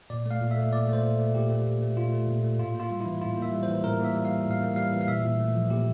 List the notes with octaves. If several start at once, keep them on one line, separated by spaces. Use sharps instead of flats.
A#2 D5
A3 F5
A#2
E5
A3
A#2 D5
A3
C5
A#2
A3
A#2 G4
A3
A#2
A3
A#2 F4
A3
A#2
A3
A2 F4
A#3 F4
G3
E4
E3
A2 F4
A#3
E5
G3
C5
E3
A2 A#4
A#3
E5
G3
F5
E3
A2
F5
A#3
G3 F5
E3
F5
A#2 E5
A#2
A3
F3
A#2 G4